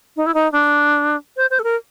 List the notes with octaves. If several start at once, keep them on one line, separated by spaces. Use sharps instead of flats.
D#4
E4
D#4
D4
C5
C5
A4
A#4